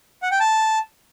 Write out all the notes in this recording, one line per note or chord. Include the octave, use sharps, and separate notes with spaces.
F#5
G5
A5